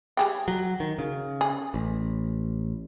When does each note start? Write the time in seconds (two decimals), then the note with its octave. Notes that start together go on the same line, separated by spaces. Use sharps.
0.17 G3 G#4 G5
0.48 F#3
0.80 D#3
0.99 C#3
1.41 G#4
1.74 A1